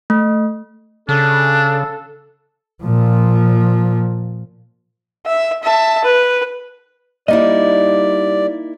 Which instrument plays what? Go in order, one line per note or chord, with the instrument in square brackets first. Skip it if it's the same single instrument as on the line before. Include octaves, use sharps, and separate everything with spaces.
[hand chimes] A3
[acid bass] C#3 [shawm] D4 [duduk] A4
[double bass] A#2 F3
[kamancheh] E5
E5 A5
B4
[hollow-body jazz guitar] G3 D#5 [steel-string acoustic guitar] A#3 D#4 E4 [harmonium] D5